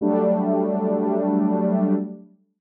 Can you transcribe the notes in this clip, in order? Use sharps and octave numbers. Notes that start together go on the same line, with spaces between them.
F#3 G3 A3 D4